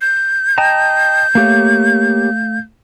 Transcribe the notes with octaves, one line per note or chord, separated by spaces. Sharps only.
G6
D#5 G5 A5 A#5
A3 A#3 G4 C#5 F5